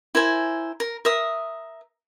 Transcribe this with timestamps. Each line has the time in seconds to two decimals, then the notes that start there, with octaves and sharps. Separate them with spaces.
0.15 E4 A#4 C5 G#5
0.80 A#4
1.05 A#4 E5 D#6